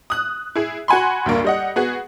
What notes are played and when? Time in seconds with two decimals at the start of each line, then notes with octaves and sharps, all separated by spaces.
0.10 D#6 F#6
0.55 E4 G#4
0.88 F#4 F#5 G#5 B5 C6
1.26 D2 G2 A#3
1.44 G3 D#5 F#5
1.76 B3 F#4 G#4